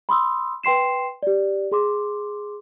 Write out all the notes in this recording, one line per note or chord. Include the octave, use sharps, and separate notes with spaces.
B5 C6 D#6 E6
B4 G5 C6 C7 E7
G4 D5
G#4 C6 D6